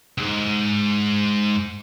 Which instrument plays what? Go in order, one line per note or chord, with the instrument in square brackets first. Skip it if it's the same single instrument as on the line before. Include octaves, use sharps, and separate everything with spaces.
[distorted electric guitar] C#2 G#2